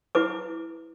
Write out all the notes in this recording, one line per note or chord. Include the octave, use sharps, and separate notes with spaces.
E4 B4 D6